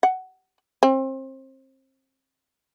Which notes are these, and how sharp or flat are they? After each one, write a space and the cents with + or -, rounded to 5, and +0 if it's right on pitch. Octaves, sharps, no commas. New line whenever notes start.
F#5 +15
C4 +30